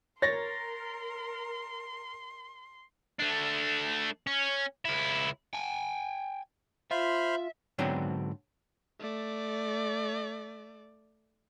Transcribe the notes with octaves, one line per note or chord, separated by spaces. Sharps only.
A#4 C#5 C6 A6 A#6
A3 D4
C#4
C#2 E4
G5 G#5
F4 C5 E5 B5 F6
G#2 D3 F#3 B3 C4 D4
A3 D5